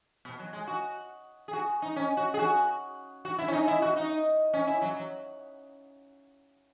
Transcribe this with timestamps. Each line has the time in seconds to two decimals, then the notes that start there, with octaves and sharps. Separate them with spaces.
0.25 B2
0.39 F#3
0.53 G#3
0.67 F#4
1.48 G#4
1.53 F#4
1.82 D#4
1.96 C#4
2.17 F#4
2.34 G#4
2.39 F#4
3.25 F#4
3.39 E4
3.48 C#4
3.53 D#4
3.68 E4
3.82 F#4
3.96 D#4
4.54 C#4
4.67 E4
4.82 F#3
4.96 F#3